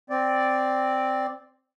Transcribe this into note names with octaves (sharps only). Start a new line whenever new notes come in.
C4 D5